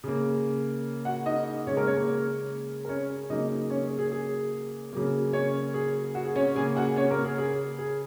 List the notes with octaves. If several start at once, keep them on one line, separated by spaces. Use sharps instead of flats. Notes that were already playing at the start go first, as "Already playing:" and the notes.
C#3 A#3
F#4 F#5
D#4 D#5
C#3 G#3 C#4 C#5
A#3 A#4
C#4 C#5
A#3 A#4
A#4
C#4 C#5
C#3 F#3 A#3 D#4 D#5
C#4 C#5
G#4
G#4
G#4
C#3 F#3 A#3
C#4 C#5
G#4
F#4
G#4
C#4 C#5
C#3 A#3 G#4 G#5
F#4 F#5
C#4 C#5
A#3 A#4
G#4
G#4
G#4